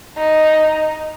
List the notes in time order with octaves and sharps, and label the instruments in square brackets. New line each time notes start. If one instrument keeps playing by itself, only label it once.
[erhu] D#4